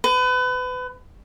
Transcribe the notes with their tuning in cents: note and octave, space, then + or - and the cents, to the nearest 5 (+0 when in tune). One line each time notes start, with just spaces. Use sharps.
B4 +30